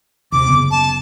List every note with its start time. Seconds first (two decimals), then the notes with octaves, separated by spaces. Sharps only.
0.32 D#2 C3 D6
0.48 F#1 C#3 B3
0.71 A5